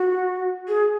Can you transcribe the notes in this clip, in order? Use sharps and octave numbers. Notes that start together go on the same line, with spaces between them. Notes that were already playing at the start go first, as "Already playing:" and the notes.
Already playing: F#4
G#4